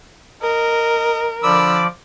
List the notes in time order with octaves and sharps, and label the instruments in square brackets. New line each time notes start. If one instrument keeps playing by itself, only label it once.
[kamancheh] A#4 [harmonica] D#5
[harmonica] D3 B5 E6 [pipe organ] F3 D5 D6